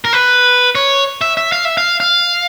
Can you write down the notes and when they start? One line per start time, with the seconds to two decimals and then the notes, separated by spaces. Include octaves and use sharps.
0.05 A#4
0.13 B4
0.75 C#5
1.21 E5
1.37 E5
1.52 F5
1.65 E5
1.77 F5
2.00 F5